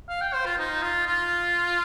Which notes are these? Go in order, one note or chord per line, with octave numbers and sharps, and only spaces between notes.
F5
G5
C5
F4
D#4
F4
F4